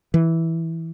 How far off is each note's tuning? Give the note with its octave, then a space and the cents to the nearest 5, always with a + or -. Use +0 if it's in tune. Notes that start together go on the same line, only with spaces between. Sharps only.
E3 -10